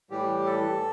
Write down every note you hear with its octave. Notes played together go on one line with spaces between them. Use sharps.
A2 E3 G3 G4
A4